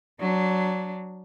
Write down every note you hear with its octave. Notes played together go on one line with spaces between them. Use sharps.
F#3 D4